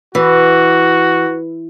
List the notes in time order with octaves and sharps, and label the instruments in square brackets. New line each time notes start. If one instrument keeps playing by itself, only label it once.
[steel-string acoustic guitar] E3 [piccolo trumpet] F#4